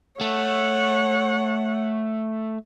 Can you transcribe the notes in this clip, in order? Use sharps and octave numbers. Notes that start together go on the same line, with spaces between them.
A3 C#5 F#5